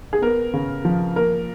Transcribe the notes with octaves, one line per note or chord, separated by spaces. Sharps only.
G#4
B3 A#4
C#3
F3
A#3 A#4